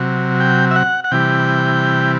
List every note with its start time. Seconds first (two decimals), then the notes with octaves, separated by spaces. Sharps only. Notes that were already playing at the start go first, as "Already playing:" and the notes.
Already playing: C3 F#3
0.40 G5
0.71 E5
0.76 F#5
1.04 F#5
1.12 C3 E3 G3 G5